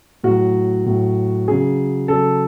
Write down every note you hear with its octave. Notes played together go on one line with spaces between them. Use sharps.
A2 F#3 F#4
A2 F#3
C#3 F#3 G#4
C#3 F#3 A4